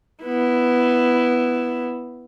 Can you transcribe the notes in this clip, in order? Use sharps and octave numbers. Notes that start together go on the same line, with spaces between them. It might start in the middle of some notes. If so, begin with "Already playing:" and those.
B3 E4